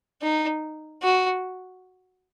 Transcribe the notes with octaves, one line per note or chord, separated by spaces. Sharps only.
D#4
F#4